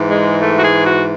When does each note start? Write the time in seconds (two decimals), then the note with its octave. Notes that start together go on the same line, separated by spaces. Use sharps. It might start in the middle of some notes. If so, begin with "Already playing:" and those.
Already playing: G#2 E3
0.09 G#3
0.40 A3
0.58 F#4
0.64 G#4
0.86 F#4